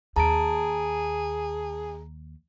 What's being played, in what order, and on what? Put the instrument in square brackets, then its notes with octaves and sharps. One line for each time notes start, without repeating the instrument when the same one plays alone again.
[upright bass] D#2 [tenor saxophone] G#4 [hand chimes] A5 [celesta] A#5 D7